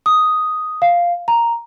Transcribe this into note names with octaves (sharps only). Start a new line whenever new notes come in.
D#6
F5
A#5